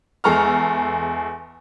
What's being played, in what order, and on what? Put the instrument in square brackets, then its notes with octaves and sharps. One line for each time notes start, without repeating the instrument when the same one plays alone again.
[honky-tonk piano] E2 G#3 A4 A#5 C#6 F6